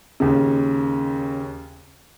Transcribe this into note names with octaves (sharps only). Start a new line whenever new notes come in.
D#2 C#3